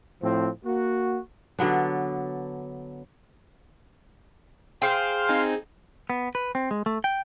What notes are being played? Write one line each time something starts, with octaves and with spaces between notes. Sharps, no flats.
A2 F3 C4
A#3 F#4
D3 F#3 B3 D4
G#4 C5 F5 G5
C4 D#4 G#5
B3
B4
C4
G#3
A3
G5